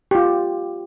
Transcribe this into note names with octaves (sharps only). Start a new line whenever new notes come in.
F4 G4